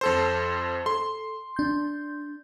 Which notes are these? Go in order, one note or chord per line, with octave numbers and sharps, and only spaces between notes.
F2 A4 C5
A4 C6
D4 G6